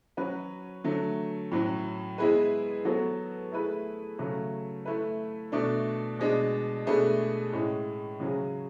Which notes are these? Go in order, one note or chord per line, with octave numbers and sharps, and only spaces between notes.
F#3 C#4 F#4 B4
D3 F#3 A3
A2 F#3 C#4
G#3 B3 E4 G#4 B4
F#3 B3 F#4 A4
A3 E4 G#4 B4
C#3 F#3 A3
A3 E4 B4
B2 A3 D4
B2 G#3 D4
B2 A3 D4 G#4 B4
A2 G#3 C#4
C#3 F#3 C#4 G#4